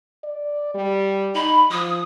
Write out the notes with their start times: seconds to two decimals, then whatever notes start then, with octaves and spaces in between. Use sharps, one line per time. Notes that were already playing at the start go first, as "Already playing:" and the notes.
0.24 D5
0.74 G3
1.35 D#4 B5
1.71 F3 D#6